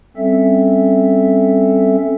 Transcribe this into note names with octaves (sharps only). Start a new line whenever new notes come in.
G3 C4 C#4 A4 E5